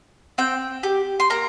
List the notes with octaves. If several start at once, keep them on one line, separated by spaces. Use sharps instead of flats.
C4 G5
G4
C6
A#3 A#5